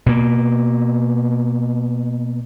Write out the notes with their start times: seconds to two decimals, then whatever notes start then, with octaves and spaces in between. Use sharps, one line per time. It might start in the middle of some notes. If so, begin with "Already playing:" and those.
0.06 B2 A#3